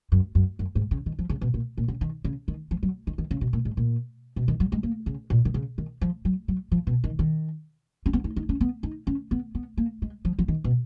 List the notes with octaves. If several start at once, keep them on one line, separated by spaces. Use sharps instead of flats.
F#2
F#2
F#2
G#2
C#3
D#3
F3
C#3
B2
A#2
A#2
C#3
D#3
C#3
D#3
F3
F#3
D#3
D#3
C#3
B2
A#2
G#2
A#2
B2
D#3
F#3
G#3
A#3
C#3
A#2
D#3
C#3
D#3
F3
F#3
F#3
F3
B2
D#3
D#3
C#4
B3
D#4
D#4
C#4
B3
D#4
C#4
B3
B3
A#3
G#3
F3
F3
D#3
B2